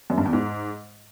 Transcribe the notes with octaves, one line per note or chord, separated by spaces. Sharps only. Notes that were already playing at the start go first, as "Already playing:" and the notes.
F#2
G2
E2
G#2